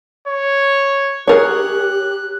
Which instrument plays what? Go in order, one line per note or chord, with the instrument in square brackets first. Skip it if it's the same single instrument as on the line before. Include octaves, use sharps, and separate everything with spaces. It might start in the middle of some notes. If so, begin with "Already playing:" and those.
[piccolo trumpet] C#5
[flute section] G4 [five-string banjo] G#4 A#4 C#5 [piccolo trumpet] F#6